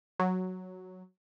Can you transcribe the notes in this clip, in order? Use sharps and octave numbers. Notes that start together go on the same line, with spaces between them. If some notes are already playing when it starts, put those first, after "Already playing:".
F#3